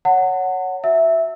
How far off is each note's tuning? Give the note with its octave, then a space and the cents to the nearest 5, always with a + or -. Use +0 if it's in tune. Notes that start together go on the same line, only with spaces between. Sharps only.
C#5 +0 F#5 +0 A5 +45
F#4 +0 E5 +0 E6 -15